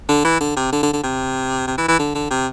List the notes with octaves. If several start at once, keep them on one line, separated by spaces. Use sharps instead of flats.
D3
E3
D3
C3
D3
D3
D3
C3
C3
E3
E3
D3
D3
C3